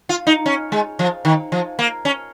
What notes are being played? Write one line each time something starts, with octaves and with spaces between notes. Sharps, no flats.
F4
D#4
C#4
G#3
F3
D#3
F3
A#3
C#4